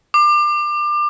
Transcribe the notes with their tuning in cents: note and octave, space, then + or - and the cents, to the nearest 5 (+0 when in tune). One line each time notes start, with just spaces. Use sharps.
D6 +30